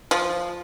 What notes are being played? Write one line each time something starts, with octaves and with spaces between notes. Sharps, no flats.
F3